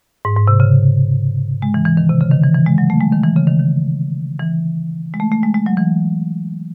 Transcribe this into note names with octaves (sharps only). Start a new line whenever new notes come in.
G#2
G#2
C3
C#3
G#3
E3
E3
D#3
C3
C#3
D#3
E3
E3
G#3
F#3
A3
G#3
D#3
E3
C#3
D#3
D#3
E3
G#3
A3
A3
G#3
G#3
F#3
E3